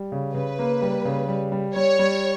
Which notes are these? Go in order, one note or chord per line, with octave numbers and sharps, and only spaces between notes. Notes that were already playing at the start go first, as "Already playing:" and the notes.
Already playing: G3
C#3
C#3 B4
A#3
G3
C#3
G3
G3
G3 C#5
G3